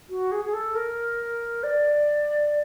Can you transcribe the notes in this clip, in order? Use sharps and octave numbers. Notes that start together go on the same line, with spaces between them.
F#4
G#4
G#4
A4
A#4
D5